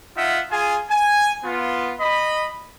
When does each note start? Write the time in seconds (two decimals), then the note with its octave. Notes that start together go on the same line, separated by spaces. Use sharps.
0.17 D#4 F4 E5 F#5
0.51 F4 G#4 G#5
0.90 G#5
1.44 B3 F4
2.00 D#5 B5